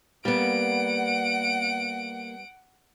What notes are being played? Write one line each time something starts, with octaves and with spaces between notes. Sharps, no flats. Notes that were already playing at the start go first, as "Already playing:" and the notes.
G3 A#3 B3 F#5 D7